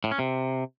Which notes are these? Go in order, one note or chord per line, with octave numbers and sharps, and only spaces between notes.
A2
C#4
C3